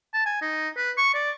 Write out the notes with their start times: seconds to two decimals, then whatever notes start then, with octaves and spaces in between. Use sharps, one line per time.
0.14 A5
0.26 G#5
0.42 D#4
0.77 B4
0.98 C#6
1.15 D5